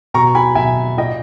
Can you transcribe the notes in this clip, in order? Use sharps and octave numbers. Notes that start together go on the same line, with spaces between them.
B2 A#5 C#6
G#5 B5
B2 E5 G#5
A#2 D#5 G5